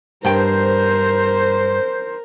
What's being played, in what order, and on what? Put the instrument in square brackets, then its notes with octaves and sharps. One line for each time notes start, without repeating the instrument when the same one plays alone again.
[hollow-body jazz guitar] G2 G5 [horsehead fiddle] A#4 [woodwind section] C5